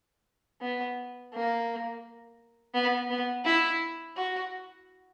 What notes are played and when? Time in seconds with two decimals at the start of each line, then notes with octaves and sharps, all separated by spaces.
0.61 B3
1.33 A#3
2.74 B3
3.10 B3
3.45 E4
4.17 F#4